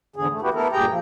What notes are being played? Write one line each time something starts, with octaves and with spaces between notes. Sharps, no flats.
E2 G#2 D3 G#4
A3
B3 E4 F#4 G4
A3 B3 E4 A4 A#4
G2 A#2 G4 G#4 G5 A#5
F3